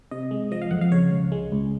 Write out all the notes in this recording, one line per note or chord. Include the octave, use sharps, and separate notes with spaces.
C3 D#5
G#3
F3 D#5
F5
F2 F#5
F5
C#3 C#5
C#2
G#3
C#2